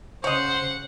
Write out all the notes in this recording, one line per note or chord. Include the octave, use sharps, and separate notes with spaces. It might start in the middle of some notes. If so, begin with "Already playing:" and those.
C#3 C5 C#5 D#5 F#5